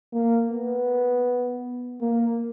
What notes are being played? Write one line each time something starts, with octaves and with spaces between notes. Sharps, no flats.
A#3
B3
A#3